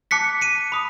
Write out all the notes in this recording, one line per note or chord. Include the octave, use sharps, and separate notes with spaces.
A5 D6 F#6 B6 C#7
C#7 D#7
B5 D#6